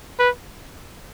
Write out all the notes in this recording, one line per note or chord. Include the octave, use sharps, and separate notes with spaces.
B4